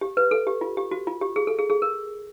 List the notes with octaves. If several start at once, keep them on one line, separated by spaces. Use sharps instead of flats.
G4
B4
A4
G4
F4
G4
F#4
F4
G4
G#4
A4
G#4
G#4
A#4